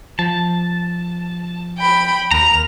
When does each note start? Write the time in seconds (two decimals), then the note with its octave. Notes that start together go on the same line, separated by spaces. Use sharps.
0.19 F3 A5
1.78 G5 B5
2.31 D#2 A#4 A#5 F7